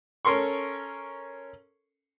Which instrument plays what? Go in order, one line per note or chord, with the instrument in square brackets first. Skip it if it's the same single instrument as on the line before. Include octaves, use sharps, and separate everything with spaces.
[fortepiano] C#4 A4 A#4 C6 C#6